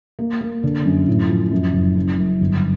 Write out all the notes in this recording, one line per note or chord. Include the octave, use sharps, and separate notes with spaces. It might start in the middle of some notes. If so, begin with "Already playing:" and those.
A#3
A#3
D3
F#2
A2
F3
F#2
F#1
C#3
F#2
G1